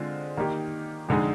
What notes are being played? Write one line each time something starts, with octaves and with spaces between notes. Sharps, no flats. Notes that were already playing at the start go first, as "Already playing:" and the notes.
Already playing: D3 G#3 C4 F4
D#3 A#3 D#4 G4
F2 D3 G#3 D#4 G#4